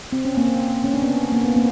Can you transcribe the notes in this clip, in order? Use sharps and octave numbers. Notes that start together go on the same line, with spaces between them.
C4
C#4
A#3 C4
C#4
D4
B3 C#4
A#3
B3
A#3 C4